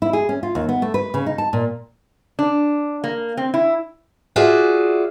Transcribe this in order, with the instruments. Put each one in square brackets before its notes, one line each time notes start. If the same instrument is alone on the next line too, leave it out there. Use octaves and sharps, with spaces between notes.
[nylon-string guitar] E4
G#4
C#4
F4
D#2
B3
A3
B4
C#3
D#4
A5
A#2
[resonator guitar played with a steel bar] D4
A#3
C4
E4
[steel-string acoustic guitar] F4 F#4 G#4 D5 E5